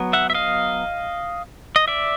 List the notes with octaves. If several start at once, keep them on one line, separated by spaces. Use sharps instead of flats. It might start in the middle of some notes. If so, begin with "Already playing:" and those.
Already playing: F#3 B3
E5 F#5
E5
D#5 F5
D#5
D5 E5